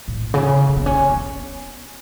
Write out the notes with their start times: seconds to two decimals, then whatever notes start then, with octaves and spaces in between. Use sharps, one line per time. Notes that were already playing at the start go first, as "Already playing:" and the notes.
0.08 A2
0.34 C#3
0.68 C#4
0.77 B3
0.86 C#4
1.09 B3